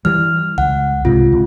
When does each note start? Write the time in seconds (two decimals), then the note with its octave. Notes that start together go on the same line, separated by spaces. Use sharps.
0.05 E3 G3 F6
0.58 C#2 F#5
1.05 C2 G#2 C3 F4
1.32 C#2